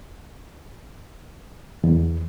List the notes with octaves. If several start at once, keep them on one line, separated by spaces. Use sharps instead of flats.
E2